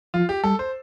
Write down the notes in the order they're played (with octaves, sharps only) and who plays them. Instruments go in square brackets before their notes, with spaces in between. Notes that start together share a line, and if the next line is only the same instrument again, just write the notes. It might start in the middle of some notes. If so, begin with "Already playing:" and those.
[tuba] F3 [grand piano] F4
[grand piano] G4
[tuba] G3 [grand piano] A4
[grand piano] C5